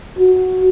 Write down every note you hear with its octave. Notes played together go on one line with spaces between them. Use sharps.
F#4